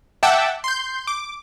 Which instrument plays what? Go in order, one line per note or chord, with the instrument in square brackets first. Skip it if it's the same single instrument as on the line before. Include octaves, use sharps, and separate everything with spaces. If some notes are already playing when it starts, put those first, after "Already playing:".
[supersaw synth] E5 F#5 G5 A5 D6 E6
C6 G6
D6